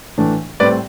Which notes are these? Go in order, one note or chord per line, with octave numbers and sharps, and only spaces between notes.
A2 E3 A3 D4
A2 G3 C4 B4 D5